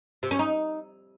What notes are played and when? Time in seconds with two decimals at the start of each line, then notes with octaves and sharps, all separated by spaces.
0.23 C3
0.31 C#4
0.39 D#4